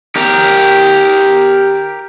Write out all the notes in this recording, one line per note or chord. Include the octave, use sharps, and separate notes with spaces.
G4 A#4